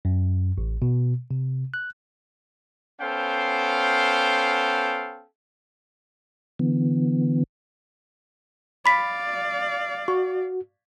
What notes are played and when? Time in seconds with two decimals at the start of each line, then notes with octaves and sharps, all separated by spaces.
0.05 F#2
0.58 A1
0.82 B2
1.31 C3
1.74 F#6
3.01 B3 C#4 A4 C5 F5 G5
6.59 D3 E3 B3
8.86 D5 F5 B5 B6
10.08 F#4 C#6